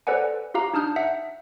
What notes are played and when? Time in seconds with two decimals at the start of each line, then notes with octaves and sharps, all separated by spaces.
0.07 A4 B4 C5 D5 F#5 G#5
0.54 F4 G4 F5 A#5
0.73 D4 D#4 A5 D#6 F6 G6
0.96 E5 F#5